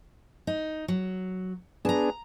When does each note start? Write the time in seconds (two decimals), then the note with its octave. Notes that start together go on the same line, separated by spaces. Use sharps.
0.47 D#4
0.88 F#3
1.85 B3 D4 G#4 A5 A#5